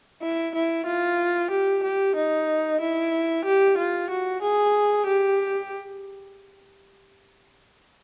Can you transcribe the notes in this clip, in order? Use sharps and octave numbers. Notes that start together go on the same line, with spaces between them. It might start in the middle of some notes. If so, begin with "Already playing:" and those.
E4
E4
F4
G4
G4
D#4
E4
G4
F4
F#4
G#4
G4